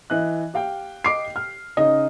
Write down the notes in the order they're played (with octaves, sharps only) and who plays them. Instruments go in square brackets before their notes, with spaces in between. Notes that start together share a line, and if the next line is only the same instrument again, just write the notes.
[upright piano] E3 D#5 F#6
G4 F5 G5
[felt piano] D#5 D6 C7
F6
[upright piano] C#3 D#4 [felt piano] D#5